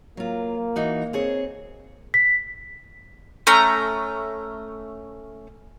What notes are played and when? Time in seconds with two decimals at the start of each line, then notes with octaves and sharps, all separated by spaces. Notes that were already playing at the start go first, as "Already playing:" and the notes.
0.17 F#3 A#3 F4
0.76 E3 D#4 F#4
1.13 C4 G#4 C#5
2.14 B6
3.47 A3 C#4 A#5